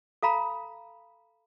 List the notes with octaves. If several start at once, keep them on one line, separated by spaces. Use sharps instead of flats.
A4 F5 A#5 B5